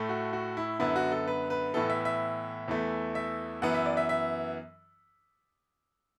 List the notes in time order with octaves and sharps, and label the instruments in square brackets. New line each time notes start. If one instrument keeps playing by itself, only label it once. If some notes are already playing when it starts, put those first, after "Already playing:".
Already playing: [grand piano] A2 A3
F#4
F#4
E4
F#2 D3 B3 E4
F#4
A4
B4
B4
A2 E3 B3 A4
E5
E5
E2 E3 A3
E5
F#2 E3 B3 F#5
E5
D5
E5
E5